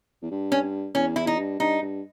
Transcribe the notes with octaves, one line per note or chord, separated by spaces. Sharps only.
E2
G2
C#4
E2 C#4
E2 E4
D#4
G2
G2 D#4
G2